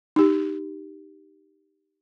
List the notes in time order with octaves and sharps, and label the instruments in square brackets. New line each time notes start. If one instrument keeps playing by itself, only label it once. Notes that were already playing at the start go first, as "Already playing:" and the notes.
[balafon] D#4 G4